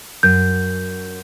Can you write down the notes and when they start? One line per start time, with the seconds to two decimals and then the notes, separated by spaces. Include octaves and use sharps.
0.23 F#2 G6